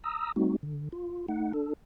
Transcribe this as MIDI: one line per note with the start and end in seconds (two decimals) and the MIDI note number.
0.04 0.32 82
0.04 0.32 87
0.04 0.32 88
0.36 0.56 55
0.36 0.56 57
0.36 0.56 60
0.36 0.56 63
0.36 0.56 66
0.63 0.89 50
0.92 1.26 65
1.28 1.52 57
1.28 1.52 63
1.28 1.52 78
1.53 1.73 62
1.53 1.73 69